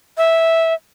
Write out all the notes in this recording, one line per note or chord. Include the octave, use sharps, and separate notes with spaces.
E5